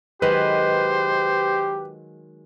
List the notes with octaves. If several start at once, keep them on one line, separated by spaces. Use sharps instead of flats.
D#3 F#3 G#3 G4 B4 C5